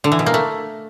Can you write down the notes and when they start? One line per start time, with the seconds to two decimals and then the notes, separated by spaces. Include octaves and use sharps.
0.04 D3
0.12 E3
0.19 B2
0.26 A#3
0.34 A3